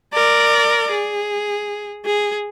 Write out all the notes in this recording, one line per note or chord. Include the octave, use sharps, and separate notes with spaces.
A#4 D5
G#4
G#4